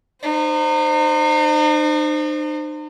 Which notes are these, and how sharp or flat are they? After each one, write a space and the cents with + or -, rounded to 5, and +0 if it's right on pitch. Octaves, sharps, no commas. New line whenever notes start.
D#4 -40 C5 +0